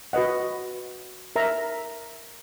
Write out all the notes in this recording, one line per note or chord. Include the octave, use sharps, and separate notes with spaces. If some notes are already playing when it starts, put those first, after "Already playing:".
F#4 B4 D#5 F#5
A#4 E5 A#5